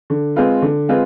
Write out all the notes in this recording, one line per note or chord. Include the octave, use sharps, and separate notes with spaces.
D3
G#3 C4 F4 B4
D3
G#3 C4 F4 B4